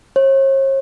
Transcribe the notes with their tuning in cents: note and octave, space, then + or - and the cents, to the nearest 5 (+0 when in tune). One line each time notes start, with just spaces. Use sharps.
C#5 -45